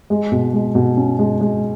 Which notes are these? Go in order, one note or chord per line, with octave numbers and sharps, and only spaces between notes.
G#3
B2
G#3
B2
C#4
G#3
G#3